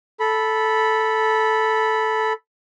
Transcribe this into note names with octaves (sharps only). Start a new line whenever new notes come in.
A4 B5